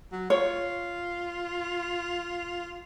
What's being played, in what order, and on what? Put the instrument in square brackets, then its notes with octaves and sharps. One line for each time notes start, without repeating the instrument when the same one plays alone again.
[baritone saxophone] F#3
[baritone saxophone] F4 [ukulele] C#5